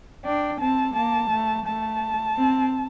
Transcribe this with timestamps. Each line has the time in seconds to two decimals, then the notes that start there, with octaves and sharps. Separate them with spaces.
0.24 D4 G5
0.61 C4 A5
0.95 A#3 A5
1.32 A3
1.66 A3 A5
2.37 C4